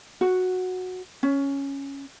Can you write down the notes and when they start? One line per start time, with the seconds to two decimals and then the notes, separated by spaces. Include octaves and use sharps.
0.21 F#4
1.23 C#4